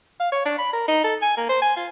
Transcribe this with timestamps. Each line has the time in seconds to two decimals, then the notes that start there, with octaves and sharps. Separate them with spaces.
0.20 F5
0.32 C#5
0.45 D4
0.58 B5
0.73 A#4
0.88 D#4
1.04 A4
1.22 G#5
1.37 A#3
1.49 C5
1.62 G#5
1.76 F4